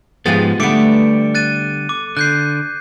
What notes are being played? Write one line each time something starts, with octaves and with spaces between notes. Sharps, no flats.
G#2 F3 B3 F4 G4 G#4 A6
D3 G3 A3 B3 D6 C#7 D7
F#6 A6 D#7
D6
D3 F#6 G6 C7